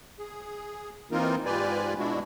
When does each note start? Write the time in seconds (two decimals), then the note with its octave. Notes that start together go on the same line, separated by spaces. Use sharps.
0.19 G#4
1.11 E3 A#3 C4 D#4 F4 A#4
1.45 G#2 F4 G4 B4 D5 G#5
1.98 B2 G#3 D4 E4 F#4